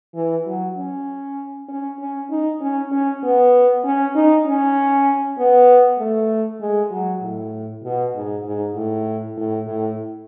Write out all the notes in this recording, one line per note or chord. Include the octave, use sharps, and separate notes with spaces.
E3
F#3
C#4
C#4
C#4
D#4
C#4
C#4
B3
C#4
D#4
C#4
B3
A3
G#3
F#3
A2
B2
G#2
G#2
A2
A2
A2